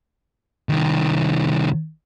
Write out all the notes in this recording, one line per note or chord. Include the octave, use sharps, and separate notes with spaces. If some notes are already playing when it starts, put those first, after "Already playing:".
C2 D#3